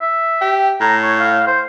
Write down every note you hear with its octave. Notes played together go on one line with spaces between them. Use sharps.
E5
G4
A2 A#5
C#5
F5
C5